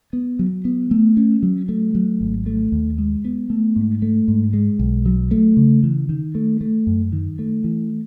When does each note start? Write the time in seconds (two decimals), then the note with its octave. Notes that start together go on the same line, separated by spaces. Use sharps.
0.13 B3
0.39 F#3
0.65 B3
0.91 A3
1.17 C#4
1.43 F#3
1.69 A3
1.95 F#3
2.21 G#1
2.46 A3
2.72 D#2
2.98 G#3
3.25 B3
3.50 A3
3.76 G#2
4.02 A3
4.28 G#2
4.53 G#3
4.79 B1
5.06 F#3
5.31 A3
5.57 C#3
5.83 E3
6.09 D#3
6.35 A3
6.61 A3
6.87 F#2
7.12 D#3
7.39 A3
7.64 E3